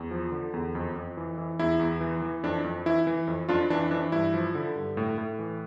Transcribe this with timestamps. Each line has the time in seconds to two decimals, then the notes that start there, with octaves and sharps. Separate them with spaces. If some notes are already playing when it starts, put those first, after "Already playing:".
Already playing: E2
0.11 F3
0.32 D3
0.54 E2
0.75 F2
0.96 F2
1.17 E3
1.38 E3
1.59 E2 E4
1.80 E2
2.01 E3
2.22 E3
2.43 F2 D4
2.64 F2
2.86 E3 E4
3.07 E3
3.28 F2
3.49 F2 D4 F4
3.70 E3 D4
3.91 E3 D4
4.12 G2 E4
4.34 F3
4.55 D3
4.75 G2
4.97 A2
5.18 A2
5.39 E3